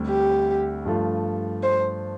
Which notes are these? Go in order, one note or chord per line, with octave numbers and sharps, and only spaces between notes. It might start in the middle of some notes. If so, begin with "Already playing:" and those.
Already playing: D2 D3 G3 C4
G4
G2 F3 A3 F4
C5